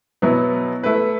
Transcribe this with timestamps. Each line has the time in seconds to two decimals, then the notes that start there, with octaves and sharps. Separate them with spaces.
0.22 B2 F#3 B3 E4
0.83 A3 E4 B4